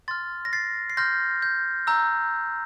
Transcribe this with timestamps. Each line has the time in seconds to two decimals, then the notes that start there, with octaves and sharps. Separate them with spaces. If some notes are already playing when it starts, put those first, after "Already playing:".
0.08 C6 F6 A6
0.45 A#6
0.53 A6 C7
0.90 C7
0.97 C6 F6 G6 A#6
1.42 G6
1.87 A#5 E6 G6